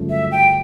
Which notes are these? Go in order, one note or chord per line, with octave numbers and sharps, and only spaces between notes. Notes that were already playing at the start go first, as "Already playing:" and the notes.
Already playing: G1 F#2 C#3 F3 A3
E5
G5